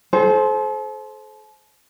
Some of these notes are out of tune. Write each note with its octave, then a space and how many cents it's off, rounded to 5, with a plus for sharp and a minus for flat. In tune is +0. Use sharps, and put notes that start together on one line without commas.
A4 -40 C5 +5